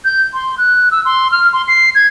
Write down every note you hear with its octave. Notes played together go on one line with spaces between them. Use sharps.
G6
C6
F#6
E6
C6
F6
C6
C7
G#6